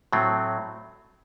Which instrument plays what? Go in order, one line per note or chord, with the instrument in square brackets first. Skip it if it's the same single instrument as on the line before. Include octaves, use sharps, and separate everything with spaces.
[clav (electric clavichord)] A2 F#3 A3 C4